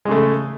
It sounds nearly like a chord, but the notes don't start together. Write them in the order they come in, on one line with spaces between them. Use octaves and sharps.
G#3 C#3 A3